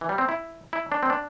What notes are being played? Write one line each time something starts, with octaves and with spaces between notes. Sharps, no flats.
E3
G3
C4
E4
E4
D4
C4
D4